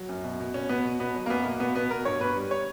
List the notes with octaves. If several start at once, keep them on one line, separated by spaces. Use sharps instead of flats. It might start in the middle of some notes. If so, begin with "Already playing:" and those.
Already playing: F#3
F#2
B2
B2
B2 C#4
B2 B3
B2
B2 B3
F#3
A#3
F#2 B3
B2 A#3
B2 B3
B2 B3
B2 A#4
G2 C#5
G2 B4
G3
C#5